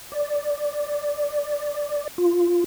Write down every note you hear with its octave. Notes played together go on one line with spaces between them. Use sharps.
D5
F4